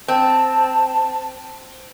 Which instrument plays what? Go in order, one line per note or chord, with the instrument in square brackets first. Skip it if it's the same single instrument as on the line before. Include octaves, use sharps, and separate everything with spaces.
[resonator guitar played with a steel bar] C4 [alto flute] A5